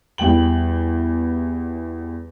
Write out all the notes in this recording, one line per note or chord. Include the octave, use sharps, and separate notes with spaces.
E2 G3 G5 F#7